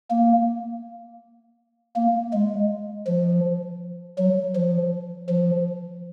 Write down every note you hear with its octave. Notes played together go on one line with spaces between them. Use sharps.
A#3
A#3
G#3
F3
F#3
F3
F3